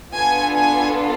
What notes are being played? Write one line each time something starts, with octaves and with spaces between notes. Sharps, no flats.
B3 D4 F4 A4 G#5
G#5